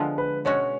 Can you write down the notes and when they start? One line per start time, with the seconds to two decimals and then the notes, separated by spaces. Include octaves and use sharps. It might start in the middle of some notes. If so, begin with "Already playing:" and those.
Already playing: D3 F3 G#3 B3 F4
0.18 B4
0.45 B2 G#3 C#4 F#4 C#5